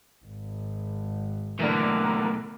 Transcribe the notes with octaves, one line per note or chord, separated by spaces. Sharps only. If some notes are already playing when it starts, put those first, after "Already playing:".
G#1
B1 A2 D3 E3 A#4